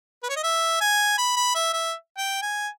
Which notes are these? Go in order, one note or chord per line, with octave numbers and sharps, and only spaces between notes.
B4
C#5
D#5
E5
G#5
B5
B5
E5
E5
G5
G#5